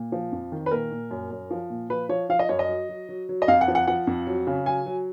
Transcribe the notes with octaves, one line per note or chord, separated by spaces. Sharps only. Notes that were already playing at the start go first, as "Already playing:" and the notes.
Already playing: A#2
F3
F2
D#3
B4
A#2 A#4
A#2
F#2
F#2
F3
A#2
F3 B4
F3 C#5
F3 F5
D#5
F#2 C#5
D#5
F#3
F#3
F#3
F#3
D#5
F2 F5
F#5
F3
F#5
F3 F#5
F2
F#3
C#3
F#3 G#5
F#3